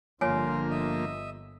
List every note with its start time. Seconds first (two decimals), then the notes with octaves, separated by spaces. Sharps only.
0.21 G1 D3 F3 A#3 F4 C#5 G#5
0.70 D#5 E5